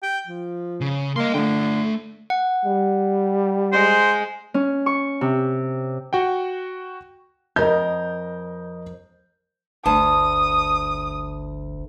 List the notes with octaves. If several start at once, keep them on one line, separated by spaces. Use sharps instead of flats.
G5
F3
C#3
A#3 D#5 C6
D3 A3 G5
F#5
G3
G#3 C5
C#4
C#6
C3
F#4 F#5 G5
F2 A#4 D#5 G6
G1 D2 A5 D#6